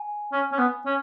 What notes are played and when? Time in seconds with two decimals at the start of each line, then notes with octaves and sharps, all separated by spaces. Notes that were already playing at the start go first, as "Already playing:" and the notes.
Already playing: G#5
0.32 C#4
0.52 C#4
0.58 B3
0.86 C#4